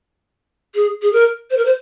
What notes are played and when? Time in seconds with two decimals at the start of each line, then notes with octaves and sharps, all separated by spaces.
0.75 G#4
1.02 G#4
1.13 A#4
1.50 C5
1.57 A#4
1.65 C5